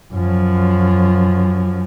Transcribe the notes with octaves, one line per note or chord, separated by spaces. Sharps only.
F#2 F3